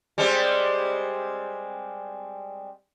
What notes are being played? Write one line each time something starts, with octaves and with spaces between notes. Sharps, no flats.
G3 G#3 C4